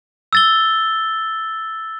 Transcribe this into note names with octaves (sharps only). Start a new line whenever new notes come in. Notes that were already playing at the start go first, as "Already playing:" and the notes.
E6 A6 G7